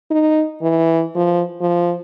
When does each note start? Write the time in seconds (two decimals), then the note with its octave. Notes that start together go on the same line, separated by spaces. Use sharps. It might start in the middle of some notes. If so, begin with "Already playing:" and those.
0.11 D#4
0.62 E3
1.15 F3
1.61 F3